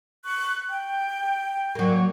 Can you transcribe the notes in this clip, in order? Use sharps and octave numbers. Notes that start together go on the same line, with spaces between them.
C#6 F#6
G5
F#3 A#3